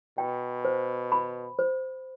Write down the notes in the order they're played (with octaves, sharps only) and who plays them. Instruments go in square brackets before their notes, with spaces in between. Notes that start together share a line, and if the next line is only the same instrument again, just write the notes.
[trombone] B2 [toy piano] G5
[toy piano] C5
B5
C5